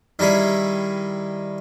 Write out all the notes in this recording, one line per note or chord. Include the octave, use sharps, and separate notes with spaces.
D#3 G3 E4 G#4